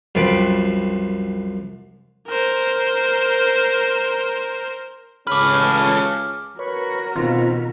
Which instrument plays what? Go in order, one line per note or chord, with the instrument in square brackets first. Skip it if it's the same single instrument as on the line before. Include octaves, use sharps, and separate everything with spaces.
[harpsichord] C2 F#2 F3 B4 G5
[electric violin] A#4 C5
[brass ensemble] C#2 C#3 C#4 [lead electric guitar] A4 B4 [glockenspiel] D6 F6
[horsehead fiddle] F#4 A#4 [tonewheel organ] B4 C#5
[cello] B2 [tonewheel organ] D#3 C4 [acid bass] F4